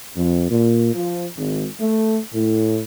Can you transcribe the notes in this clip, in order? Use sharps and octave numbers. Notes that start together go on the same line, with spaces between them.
F2
A#2
F3
G#1
A3
A2